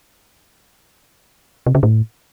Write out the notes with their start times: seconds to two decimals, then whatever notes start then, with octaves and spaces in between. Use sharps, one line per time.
1.66 C3
1.75 C#3
1.83 A2